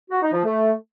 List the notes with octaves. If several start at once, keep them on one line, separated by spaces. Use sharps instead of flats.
F#4
D#4
F3
A3